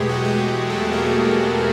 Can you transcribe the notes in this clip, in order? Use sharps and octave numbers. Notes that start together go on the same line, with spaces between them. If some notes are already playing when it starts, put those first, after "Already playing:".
Already playing: E2 B2 F#3 G#3 A3 G4 G#4
F#4
G4
A3 A4
A#3 A#4